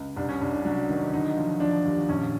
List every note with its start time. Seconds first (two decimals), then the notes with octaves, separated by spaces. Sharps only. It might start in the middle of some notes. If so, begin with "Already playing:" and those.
Already playing: C#2
0.17 C2 D4
0.29 C#4
0.41 C2 D4
0.53 D4
0.65 F#3 D4
0.89 D#3
1.13 D3 D#4
1.37 F3
1.60 F3 D4
1.85 D#2
2.09 A#1 C#4